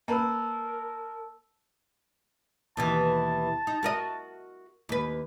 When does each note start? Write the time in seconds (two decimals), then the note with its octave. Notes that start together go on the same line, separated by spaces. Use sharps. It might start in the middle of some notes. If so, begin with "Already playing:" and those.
0.08 A#3 A#4 B4 A5 E6
2.77 D#2 B2 E3 A5
3.67 D#4
3.83 F#4 A#4 D#5
4.89 D#2 B4